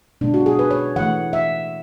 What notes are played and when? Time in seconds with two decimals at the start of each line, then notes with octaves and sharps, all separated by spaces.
0.21 B2 G#3 B3 D4
0.34 F#4
0.46 G#4
0.59 B4
0.71 C#5
0.96 E3 A3 F#5
1.33 E5